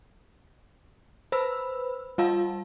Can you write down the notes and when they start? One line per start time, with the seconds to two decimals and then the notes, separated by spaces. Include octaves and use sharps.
1.32 B4 C5 B5 E6
2.18 G3 F4 F5 A5